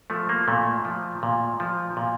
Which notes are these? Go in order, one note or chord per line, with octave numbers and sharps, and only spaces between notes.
F3 A3
A#3
A#2 A3
F3
A#2
F3
A#2